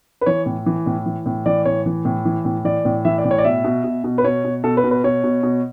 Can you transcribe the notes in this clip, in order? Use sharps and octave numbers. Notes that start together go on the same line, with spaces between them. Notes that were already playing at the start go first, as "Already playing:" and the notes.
B4
E3 C#5
A2
E3
A2
E3
A2
E3 D5
A2 C#5
E3
A2
E3
A2
E3 D5
A2
E3 E5
D5
A2
C#5
D5
B2 E5
B2
B2
B2
B4
B2 C#5
B2
B2 A4
B4
B2
B4
B2 C#5
B2
B2